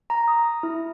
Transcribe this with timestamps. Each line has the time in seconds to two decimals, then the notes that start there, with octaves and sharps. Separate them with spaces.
0.10 A#5
0.28 D#6
0.63 E4